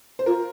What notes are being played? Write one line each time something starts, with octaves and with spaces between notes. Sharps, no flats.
C5
F4 A#4